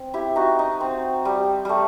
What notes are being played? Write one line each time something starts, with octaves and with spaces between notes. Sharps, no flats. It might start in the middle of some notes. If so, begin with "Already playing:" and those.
Already playing: C4
E4 G4
D#4 F#4
D#4
C4
G3
G3 A3